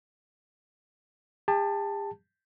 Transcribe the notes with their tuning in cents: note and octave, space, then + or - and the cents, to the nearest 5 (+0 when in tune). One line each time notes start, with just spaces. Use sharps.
G4 +45 A5 +10